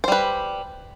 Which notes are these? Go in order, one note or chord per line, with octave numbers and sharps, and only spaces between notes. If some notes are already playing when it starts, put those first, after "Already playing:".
G3 B4 C5